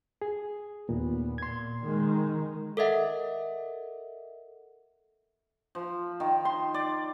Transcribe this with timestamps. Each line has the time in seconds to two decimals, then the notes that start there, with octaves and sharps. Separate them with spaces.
0.22 G#4
0.89 D#2 A#2 B3
1.38 A#2 C6 G#6
1.85 D#3 G#3
2.77 A4 A#4 D#5 E5 F#5
5.75 F3
6.20 D#3
6.45 C6
6.74 D5